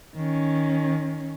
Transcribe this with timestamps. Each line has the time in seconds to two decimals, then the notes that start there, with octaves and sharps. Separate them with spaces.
0.15 D#3 C#4